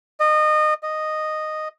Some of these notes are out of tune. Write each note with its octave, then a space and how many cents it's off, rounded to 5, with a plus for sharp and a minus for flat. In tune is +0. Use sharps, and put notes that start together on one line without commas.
D#5 -25
D#5 -10